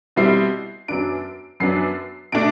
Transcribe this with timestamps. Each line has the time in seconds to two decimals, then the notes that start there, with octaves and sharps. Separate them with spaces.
0.16 B2 G3 C4 E4 C7
0.88 F#2 F#3 B3 D4 D7
1.60 F#2 F#3 B3 D4 C7
2.32 B2 A3 D4 D7